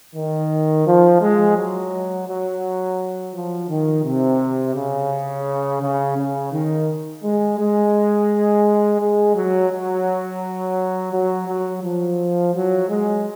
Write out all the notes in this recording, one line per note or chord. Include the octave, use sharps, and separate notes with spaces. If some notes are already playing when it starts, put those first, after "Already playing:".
D#3
F3
G#3
F#3
F#3
F3
D#3
C3
C#3
C#3
C#3
D#3
G#3
G#3
G#3
F#3
F#3
F#3
F#3
F3
F#3
G#3